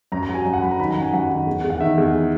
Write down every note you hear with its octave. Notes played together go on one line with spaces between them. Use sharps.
F#2 A#5
A#5
F#3
G#5
F#2
F#5
F#3 B5
A#5
D#3 B5
A#5
F#2 F#5
G#5
F#2 F#5
D#3 F#5
E2
E2
F#5
D#3 E5
E2